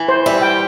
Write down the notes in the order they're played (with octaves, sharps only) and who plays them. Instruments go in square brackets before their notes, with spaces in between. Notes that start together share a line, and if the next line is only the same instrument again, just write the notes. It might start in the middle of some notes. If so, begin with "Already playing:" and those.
Already playing: [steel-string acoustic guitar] E3
[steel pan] C5
[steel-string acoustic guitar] G3 [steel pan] E5
[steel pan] G5